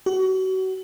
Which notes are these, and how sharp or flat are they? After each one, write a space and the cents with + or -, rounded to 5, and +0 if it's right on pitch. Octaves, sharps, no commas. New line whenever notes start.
F#4 +30